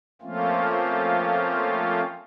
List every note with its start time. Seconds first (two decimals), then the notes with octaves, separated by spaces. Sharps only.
0.22 F3 A3 A#3 C4 C#4 F4